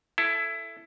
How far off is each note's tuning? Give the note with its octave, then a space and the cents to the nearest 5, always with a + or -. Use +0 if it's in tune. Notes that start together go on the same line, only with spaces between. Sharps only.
E4 +15 A4 +0 A5 -5